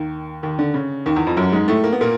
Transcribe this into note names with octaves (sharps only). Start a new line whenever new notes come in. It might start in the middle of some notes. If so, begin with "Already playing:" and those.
Already playing: D#2 D#3
D#2 D#3
D3
C#3
D#2 D#3
E2 E3
F2 F3
F#2 F#3
G#2 G#3
A2 A3
A#3
B3
A#2 A#3